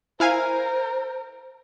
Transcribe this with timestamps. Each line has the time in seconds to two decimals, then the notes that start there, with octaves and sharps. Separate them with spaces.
0.20 E4 A#4 C5 F5 G#5